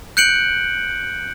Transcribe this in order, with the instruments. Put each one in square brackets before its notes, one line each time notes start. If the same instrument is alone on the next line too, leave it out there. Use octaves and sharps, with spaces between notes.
[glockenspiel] F#6 G6 C#7 D7 F#7